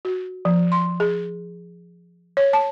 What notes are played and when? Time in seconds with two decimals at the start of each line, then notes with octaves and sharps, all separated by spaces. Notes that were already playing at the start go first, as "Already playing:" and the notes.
0.05 F#4
0.45 F3
0.72 C6
1.00 G#4
2.37 C#5
2.53 A5